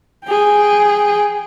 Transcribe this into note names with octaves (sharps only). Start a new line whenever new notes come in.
G#4 G5